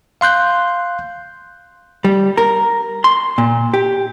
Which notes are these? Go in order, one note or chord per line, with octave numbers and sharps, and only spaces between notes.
F5 C6 F#6 G6
G3
A#4
C6
A#2
G4